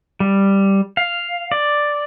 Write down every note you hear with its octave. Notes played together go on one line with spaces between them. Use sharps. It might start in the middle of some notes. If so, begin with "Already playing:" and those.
G3
F5
D5